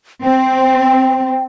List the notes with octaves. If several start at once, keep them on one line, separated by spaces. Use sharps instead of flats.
C4 G5